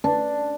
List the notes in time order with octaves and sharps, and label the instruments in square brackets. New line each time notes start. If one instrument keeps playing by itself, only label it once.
[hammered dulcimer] D4